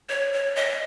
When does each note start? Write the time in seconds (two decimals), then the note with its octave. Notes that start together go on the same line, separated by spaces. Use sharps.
0.09 C#5
0.33 C#5
0.56 D#5